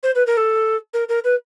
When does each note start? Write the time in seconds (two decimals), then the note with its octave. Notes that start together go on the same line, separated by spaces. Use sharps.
0.03 C5
0.15 B4
0.26 A#4
0.37 A4
0.93 A#4
1.09 A#4
1.24 B4